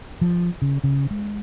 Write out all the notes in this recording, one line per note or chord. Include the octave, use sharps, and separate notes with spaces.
F3
C#3
C#3
G#3